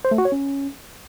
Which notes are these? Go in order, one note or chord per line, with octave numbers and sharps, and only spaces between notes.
C5
A3
F#4
C#5
C#4